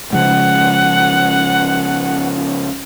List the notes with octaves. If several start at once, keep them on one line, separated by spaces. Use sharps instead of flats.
C#3 F3 G#3 F#5